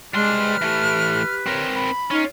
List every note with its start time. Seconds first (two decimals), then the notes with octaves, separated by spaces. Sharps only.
0.14 G3 G#3 D4 C6 F6
0.40 B4
0.62 E3 A3 G4
1.46 C4 A#4 C#5
1.75 B5
2.11 C#4 D#4 F4